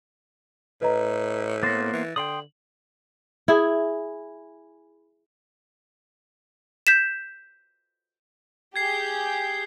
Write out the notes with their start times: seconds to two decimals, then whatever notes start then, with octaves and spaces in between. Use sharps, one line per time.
0.82 A2 B4 D#5 A#5
1.63 A#3 B3 C5 A6 A#6
1.93 E3
2.16 D3 G5 C6 D#6 F#7
3.48 E4 G#4
6.87 G6 B6 E7
8.76 G4 G#4 G6 G#6 C7